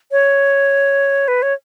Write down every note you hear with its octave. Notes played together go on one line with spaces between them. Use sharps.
C#5
B4
C#5